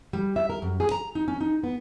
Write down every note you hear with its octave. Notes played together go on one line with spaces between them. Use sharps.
G3
E5
A#4
F#2
G#4
A#5
D#4
C#4
D#4
B3